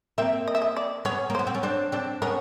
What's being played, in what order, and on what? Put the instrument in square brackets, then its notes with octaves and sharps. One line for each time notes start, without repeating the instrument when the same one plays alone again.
[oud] A#3 C4 [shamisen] E5
[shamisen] D#5
E5
D#5
D5
[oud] B3 C#4 [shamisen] C#5
[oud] A#3
[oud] B3 [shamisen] C5
[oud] C4
C#4
C4 D4
C4 D4
[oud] B3 C#4 [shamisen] A#4